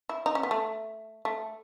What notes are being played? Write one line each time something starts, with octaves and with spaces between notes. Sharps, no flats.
E4
D#4
C#4
B3
A3
A3